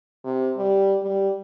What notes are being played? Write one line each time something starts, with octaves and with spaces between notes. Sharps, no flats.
C3
G3
G3